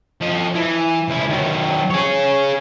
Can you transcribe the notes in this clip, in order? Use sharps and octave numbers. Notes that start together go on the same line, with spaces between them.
F3 D#5
E3
C#2 E4
D#3 F#3
G#4 C#5